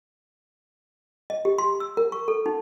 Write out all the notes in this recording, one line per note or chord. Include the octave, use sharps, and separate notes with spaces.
D#5
G4
C6
E6
A#4
C#6
A4
D#4